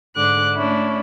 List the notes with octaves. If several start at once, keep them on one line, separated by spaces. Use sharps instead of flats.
G#2 D3 D6 F#6
A3 C#4 D4 E4